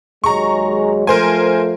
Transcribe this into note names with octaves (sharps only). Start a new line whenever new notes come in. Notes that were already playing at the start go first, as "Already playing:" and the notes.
D#2 F#3 G#3 A#5 C#6
F3 A3 A#4 C5 G#5